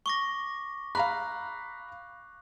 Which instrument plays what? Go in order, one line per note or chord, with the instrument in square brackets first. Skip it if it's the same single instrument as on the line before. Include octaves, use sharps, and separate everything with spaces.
[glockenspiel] C#6 D6 A#6
[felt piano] F5 A#5 B5 [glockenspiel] F#6